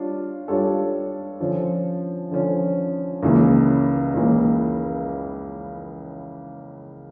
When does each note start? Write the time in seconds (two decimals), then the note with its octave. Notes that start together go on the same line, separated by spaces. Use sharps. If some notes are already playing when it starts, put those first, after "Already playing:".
Already playing: G3 D4 F4 C#5
0.48 G3 D4 F4 A4 C#5
1.40 D3 F3 C#4
2.31 D3 F3 C#4
3.23 C#2 C#3 E3 A#3
4.14 C#2 C#3 E3 A#3